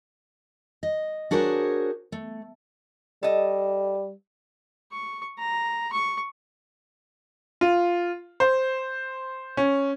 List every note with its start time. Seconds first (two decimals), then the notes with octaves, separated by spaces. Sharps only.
0.83 D#5
1.31 D4 F#4 G#4 A#4 C5 C#5
2.12 A3
3.23 G3 A4 D#5
4.92 C#6
5.39 A#5
5.92 C#6
7.61 F4
8.40 C5
9.57 C#4